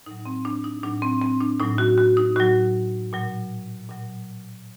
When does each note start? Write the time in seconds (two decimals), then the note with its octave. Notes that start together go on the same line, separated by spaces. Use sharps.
0.06 A2 F#3 D#4
0.26 C4
0.45 D4
0.64 D#4
0.83 A2 F#3 D4
1.02 C4
1.22 C4
1.41 D4
1.60 A2 F#3 D#4
1.78 F#4
1.98 F#4
2.17 D#4
2.36 A2 F#3 F#4
3.13 A#2 F#3
3.89 A#2 F#3